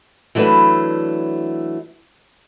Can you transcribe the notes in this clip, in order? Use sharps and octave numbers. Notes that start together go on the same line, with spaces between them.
E3 F#3 A3 D4 B4